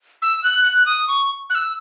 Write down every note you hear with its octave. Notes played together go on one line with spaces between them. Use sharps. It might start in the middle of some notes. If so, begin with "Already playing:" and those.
E6
F#6
F#6
D#6
C#6
F#6
E6